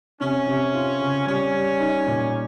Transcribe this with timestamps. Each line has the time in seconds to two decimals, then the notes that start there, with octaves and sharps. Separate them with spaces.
0.21 C3 C#4
0.47 C3
0.75 F4
1.01 C#3
1.27 G3 C#4
1.54 G3
1.80 D#4
2.07 A#2